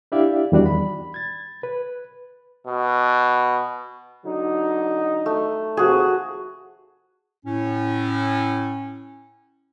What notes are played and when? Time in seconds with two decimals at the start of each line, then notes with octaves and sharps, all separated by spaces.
0.12 D4 E4 G4 D5 E5 F5
0.52 E2 D#3 G3 D4 F#4 D5
0.66 B5
1.14 G#6 A6
1.63 B4
2.67 B2
4.25 D3 F#3 D#4
5.26 A3
5.77 D#2 C3 F3 F#4 G#4
7.45 A2 C#4